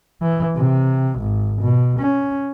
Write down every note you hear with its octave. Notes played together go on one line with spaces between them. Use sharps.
E3
C3
G#1
B2
C#4